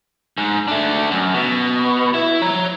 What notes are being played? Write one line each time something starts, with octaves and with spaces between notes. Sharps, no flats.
G#2
A3 D4
F#2
B2
E4
C#5 A#5